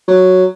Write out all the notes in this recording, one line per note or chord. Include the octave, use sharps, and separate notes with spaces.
F#3